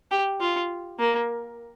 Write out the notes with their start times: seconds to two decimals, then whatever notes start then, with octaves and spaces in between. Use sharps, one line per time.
0.11 G4
0.41 F4
0.99 A#3